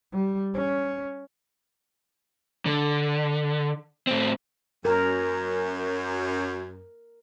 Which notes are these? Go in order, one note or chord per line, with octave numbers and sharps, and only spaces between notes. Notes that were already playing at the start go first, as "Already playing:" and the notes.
G3
C#4
D3
A2 C4
F#2 A#4